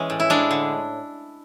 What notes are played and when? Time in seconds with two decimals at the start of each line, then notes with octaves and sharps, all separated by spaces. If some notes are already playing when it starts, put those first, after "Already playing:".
Already playing: E3 G#3 C#4
0.10 A2
0.20 E4
0.30 G#3 D4
0.51 D3